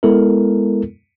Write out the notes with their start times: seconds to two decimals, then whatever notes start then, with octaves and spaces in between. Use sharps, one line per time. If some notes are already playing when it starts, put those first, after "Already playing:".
0.03 G#3 B3 E4 A4 A#4